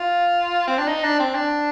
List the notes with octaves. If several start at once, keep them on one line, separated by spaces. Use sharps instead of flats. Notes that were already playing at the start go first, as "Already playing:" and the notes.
Already playing: F4
C4
D4
D#4
D4
C4
D4